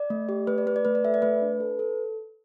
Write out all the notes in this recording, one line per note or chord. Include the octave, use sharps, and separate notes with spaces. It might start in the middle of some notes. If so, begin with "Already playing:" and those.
Already playing: D5
A3
G4
A3 B4
D5
A3 B4
D5
A3 B4
D5
A4 E5
D5
A3 B4
D4
A4
A4